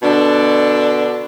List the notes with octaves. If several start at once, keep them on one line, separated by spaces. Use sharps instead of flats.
B2 D3 D4